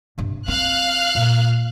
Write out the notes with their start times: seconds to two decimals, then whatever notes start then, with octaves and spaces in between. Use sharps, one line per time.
0.18 G2 C3
0.48 C4 F5 F6 F#6
1.15 A#2